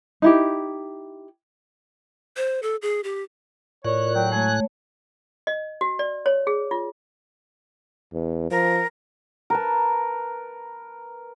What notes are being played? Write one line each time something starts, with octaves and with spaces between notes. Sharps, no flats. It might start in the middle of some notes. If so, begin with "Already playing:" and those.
D#4 E4 G4
C5
A4
G#4
G4
A2 F4 A#4 C#5 D5 F#6
F#3 G5
G#3 A3 C#5 G#5
D#5
F#4
D5
C#5
G#4
F4
E2
F3 A#4
A#4 B4 A5